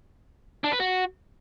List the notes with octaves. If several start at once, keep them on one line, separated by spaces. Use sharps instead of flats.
D4
B4
F#4